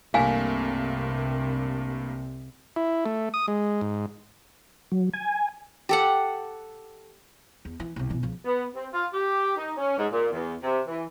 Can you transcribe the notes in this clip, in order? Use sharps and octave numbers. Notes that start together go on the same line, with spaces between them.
C2 G2 C3 A3 A#3 F5 G#5
E4
A3
D#6
G#3
G#2
F#3
G#5
G4 A4 F#5
E2
E3
C2 C3
B2 E3
C#2 F3
B3
C4
F4
G4
D#4
C#4
G#2
A#2
E2
C3
E3